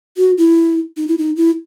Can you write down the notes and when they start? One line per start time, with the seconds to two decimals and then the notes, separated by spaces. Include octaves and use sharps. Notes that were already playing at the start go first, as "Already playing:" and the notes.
0.17 F#4
0.38 E4
0.97 D#4
1.08 E4
1.18 D#4
1.36 E4